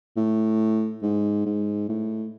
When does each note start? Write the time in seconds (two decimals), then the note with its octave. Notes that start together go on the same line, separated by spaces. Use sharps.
0.17 A2
1.03 G#2
1.46 G#2
1.89 A2